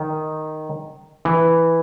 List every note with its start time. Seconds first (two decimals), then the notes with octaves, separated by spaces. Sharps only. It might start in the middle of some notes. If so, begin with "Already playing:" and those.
Already playing: D#3
1.25 E3